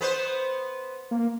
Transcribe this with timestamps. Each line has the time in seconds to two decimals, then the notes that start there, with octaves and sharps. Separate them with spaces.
0.01 B3 B4 C5
1.11 A#3